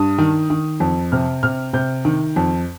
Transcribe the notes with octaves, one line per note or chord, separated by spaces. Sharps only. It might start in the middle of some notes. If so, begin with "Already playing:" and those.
Already playing: G2 D#6
D#3
D#3
F2
C3 F6
C3 F6
C3 G6
D#3
F2